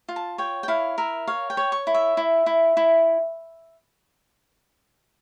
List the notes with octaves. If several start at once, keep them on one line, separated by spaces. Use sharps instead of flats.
F4
A5
C#5 G5
G5
E4 F5
A#4 E5
C#5 F5
G5
C#5
C#6
E4
E5
E4
E4
E4